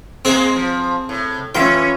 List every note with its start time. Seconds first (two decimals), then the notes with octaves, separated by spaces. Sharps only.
0.25 G#3 A#3 C4 G#4
0.56 F3
1.09 A2
1.55 E3 C#4 F4 E5 G5